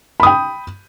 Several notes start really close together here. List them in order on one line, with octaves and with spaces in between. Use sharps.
B5 D#6 G5